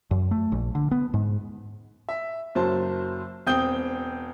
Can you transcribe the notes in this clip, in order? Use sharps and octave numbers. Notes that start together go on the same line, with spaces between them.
F#2
A3
A#1
D3
B3
G#2
E5
F#1 F#3 C5 A5
E1 C4 G5 D#6 G6 G7